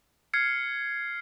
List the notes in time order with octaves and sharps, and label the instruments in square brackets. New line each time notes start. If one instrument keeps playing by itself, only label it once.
[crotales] F6 G#6 C7 C#7